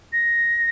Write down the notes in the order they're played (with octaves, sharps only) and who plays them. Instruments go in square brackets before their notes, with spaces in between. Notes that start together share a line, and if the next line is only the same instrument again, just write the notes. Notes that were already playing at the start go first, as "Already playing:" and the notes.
[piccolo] A#6